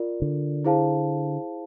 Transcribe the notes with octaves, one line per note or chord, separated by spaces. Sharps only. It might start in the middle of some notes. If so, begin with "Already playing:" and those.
Already playing: F4 A#4 D5
D3
E4 G#4 C5 F5 A5